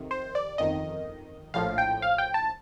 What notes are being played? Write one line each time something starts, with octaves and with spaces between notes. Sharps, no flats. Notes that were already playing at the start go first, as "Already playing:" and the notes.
Already playing: F2 C3 D#3
C5
D5
G1 F2 D#3 D#5
A#1 A2 F3 F5
G5
F5
G5
A5